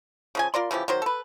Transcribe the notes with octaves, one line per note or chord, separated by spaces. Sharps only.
C#3 F3 G#5
F4 A#4 D5 C6
C#3 E3 F3 G4
D#3 F#3 C5
A4 B4